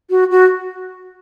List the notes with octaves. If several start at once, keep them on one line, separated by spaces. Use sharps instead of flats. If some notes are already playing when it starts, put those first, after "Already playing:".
F#4
F#4